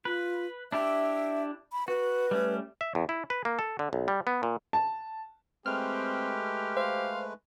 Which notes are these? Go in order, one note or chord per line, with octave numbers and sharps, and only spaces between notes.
F4 B4
D4 E4 G4 E5
B5
F#4 B4
G3 A3 C#4
E5
E2
E4
B4
A#3
A4
D3
B1
G3
B3
A#2
A5
G#3 A3 C4 G4 B4 F6
C5 F5